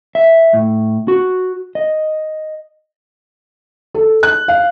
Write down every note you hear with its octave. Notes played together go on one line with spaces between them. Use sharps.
E5
A2
F#4
D#5
A4
F#6
F5